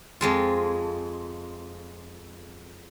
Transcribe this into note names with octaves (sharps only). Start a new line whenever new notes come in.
F2 G#3 F4